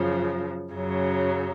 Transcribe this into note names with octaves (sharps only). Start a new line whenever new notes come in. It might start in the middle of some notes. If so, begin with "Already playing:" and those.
Already playing: F#2 C#3 F3
F#2 C#3 F#3